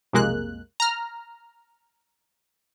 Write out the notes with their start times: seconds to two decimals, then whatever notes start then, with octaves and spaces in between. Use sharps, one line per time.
0.13 B1 F2 C3 G#3 A#3 F#6
0.80 A#5 F6